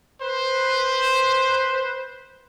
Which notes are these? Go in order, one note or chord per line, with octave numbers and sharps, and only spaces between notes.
B4 C5